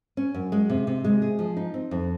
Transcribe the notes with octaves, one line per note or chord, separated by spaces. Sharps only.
C#4
F#2
G#3
C3
C3
G#3
G#4
F3
D#4
C4
F2